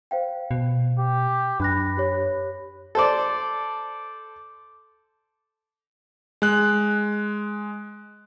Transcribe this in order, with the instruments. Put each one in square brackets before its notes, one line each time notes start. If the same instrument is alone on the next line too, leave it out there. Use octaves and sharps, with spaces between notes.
[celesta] C5 F5 G5
[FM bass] B2
[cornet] G4
[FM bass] F#2 [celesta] D4 F#6 A#6 [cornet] B4
[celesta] G4 C#5
[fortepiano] A4 C5 D5
[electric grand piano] G#3 F#6